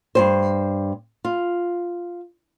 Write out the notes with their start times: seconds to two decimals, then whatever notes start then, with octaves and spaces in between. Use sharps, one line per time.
0.15 G2 A#2 C5
1.25 F4